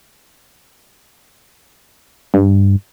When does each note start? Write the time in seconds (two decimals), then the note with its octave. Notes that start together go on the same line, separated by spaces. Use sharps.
2.34 G2